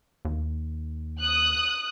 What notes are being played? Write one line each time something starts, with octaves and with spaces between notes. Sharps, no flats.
D#2
D#6 F#6